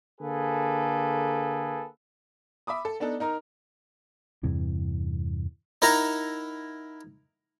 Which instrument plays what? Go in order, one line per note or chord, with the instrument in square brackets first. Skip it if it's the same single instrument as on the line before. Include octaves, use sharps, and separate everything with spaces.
[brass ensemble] D3 A#3 G#4 A4 B4
[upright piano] E5 B5 D6 D#6
A4
B3 D4 D#4 A4
D#4 A#4 A#5 F6
[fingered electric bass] E2 G2 C3 E3
[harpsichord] D#4 E4 A#4 E5 F#5 A#5